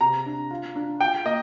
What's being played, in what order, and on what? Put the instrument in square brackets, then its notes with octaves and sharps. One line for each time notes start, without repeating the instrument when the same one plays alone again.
[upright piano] C3 A#5
D4
F4
D4
F4 G5
A#3 D#5